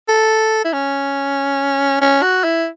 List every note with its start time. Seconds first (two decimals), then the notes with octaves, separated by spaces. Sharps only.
0.09 A4
0.65 E4
0.73 C#4
2.01 C#4
2.22 F#4
2.44 E4